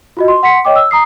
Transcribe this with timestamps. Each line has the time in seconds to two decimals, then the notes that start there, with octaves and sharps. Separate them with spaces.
0.17 F4 F#4 D#5
0.28 C6
0.43 F#5 C6 B6 C#7
0.65 C#5 D#5 G5 D6
0.76 E6
0.91 A#5 D#6 C7